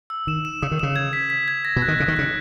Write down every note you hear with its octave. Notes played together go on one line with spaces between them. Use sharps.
E6
D#3 E7
E7
C#3 D#6
D#3
C#3 E7
G#6
B6
B6
G#6
A#6
B2
F#6
D#3
C#3 F#6
D#3
C#3 F#6